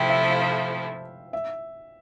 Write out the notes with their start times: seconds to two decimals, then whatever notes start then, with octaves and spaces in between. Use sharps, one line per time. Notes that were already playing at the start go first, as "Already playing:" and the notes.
Already playing: C3 F3 A3 E4 G5
0.10 E5
0.30 F5
1.33 E5